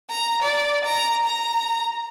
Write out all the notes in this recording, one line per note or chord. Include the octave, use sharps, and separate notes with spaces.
A#5
D5
A#5
A#5